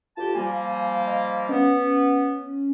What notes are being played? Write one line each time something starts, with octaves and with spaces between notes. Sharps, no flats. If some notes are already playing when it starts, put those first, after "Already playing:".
D2 F4 G4 A5
F3 G3 A#3 G#5
D#5
B3 C#4